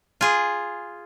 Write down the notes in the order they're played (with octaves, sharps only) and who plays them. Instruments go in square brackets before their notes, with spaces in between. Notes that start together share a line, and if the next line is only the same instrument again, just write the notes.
[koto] F4 G#4